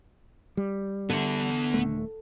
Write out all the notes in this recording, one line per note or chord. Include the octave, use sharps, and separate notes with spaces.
G3
D3 B3 E5
D#1 A3